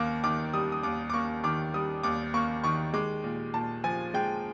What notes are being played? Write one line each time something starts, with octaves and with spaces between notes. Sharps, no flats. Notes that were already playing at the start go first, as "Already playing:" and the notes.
Already playing: D#2 A#3 D6
D#3 D6
G3 D#6
D#6
D#2 D6
D6
A#3 C#6
D#3 D6
G3 D#6
D#2 D6
A#3 C#6
D#3 C#6
G#3 D6
A#2
A#2 A5
F3 G#5
G#3 G5